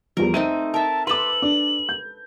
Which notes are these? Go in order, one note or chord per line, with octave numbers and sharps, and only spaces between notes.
E2 F3 G3 A#4
A3 C4 D#4 D#7
A#4 E5 A5
A4 B4 C6 D6 F#7
D4
G6